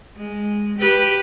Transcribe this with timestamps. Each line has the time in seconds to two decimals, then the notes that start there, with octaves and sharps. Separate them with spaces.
0.17 G#3
0.78 G4 B4